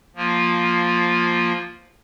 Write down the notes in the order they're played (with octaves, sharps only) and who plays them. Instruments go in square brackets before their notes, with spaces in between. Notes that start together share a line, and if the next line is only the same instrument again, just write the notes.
[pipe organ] F3 A#3 F4